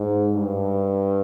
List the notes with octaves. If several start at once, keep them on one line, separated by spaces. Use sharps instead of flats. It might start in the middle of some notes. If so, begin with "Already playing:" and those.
Already playing: G#2
G2